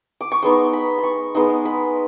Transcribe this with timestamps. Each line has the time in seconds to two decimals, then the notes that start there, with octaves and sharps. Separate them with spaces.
0.21 D6
0.32 C#6
0.43 G#3 B3 D#4 C6
0.73 B5
0.98 C6
1.03 C#6
1.35 G#3 B3 D#4 C6
1.65 B5